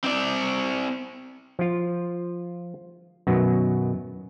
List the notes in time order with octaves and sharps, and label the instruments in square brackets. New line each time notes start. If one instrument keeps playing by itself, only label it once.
[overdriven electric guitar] C4 D5
[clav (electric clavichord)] F3 F4
F#2 B2 D#3 F#3